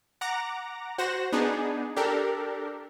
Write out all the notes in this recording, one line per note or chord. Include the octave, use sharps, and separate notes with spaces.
F#5 A#5 D6 A#6
F#4 C5 F#5 A#6 E7
B3 D4 D#4 G#4
D4 G4 A4 A#4